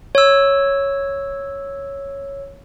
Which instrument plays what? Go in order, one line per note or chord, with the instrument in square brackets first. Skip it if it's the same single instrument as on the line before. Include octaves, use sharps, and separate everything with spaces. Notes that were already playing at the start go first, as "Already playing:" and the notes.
[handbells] C#5 E6